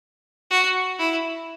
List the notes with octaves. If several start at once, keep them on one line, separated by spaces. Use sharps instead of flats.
F#4
E4